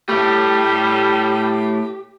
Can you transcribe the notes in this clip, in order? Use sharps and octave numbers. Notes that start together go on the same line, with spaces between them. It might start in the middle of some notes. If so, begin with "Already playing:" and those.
A2 G3 A3 G4